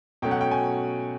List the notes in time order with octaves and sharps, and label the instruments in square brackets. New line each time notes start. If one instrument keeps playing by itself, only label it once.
[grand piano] B2 F#3 A3 C#4 G5
F#5
G5
G#5